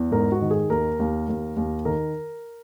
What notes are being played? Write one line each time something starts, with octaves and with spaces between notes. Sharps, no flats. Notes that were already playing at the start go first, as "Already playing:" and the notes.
Already playing: E2
G#2 A#4
F#4
D#3
G#4
D#2 A#4
D#2
D#2
D#2
D#3 A#4